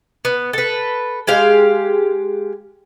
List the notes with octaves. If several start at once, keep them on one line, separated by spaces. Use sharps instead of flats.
B3
A4 B4
G#3 G4 F5